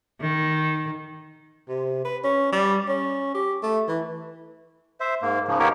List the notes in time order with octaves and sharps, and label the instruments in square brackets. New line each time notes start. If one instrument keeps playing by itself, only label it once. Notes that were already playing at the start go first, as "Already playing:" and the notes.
[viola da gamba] D#3
[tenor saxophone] C3
B4
C#4
G3
C#4
G4
A3
E3
[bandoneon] C5 E5
G#2 A#3
G#2 C#3 F3
A#3 B3 D#4 G4 A#4 C#5